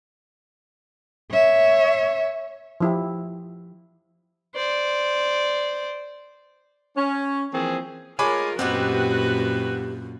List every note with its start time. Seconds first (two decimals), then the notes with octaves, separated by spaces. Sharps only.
1.31 C#5 E5
2.81 F3 E4 G4
4.56 C5 D5
6.97 C#4
7.54 E3 F3 A#3 C4 G#4
8.19 G#3 A3 F4 A#4 C#5 G#5 B5 D6
8.59 F#2 A#2 B3 C4 D#4 F#4 G4 B4